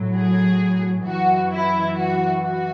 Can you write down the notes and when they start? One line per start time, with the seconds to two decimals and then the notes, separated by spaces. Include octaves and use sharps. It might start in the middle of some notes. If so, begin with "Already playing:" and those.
Already playing: A2 F#3
0.17 G#4
1.06 F#2 E3 F#4
1.52 E4
1.96 F#4
2.40 F#4